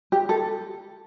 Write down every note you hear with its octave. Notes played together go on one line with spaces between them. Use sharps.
G4
A4